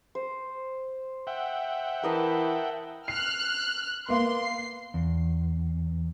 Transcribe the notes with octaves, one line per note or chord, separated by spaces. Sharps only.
C5
E5 F#5 G5
E3 A#4 D#5 A5
F6 F#6 C7
A#3 B3 C6
C7
E2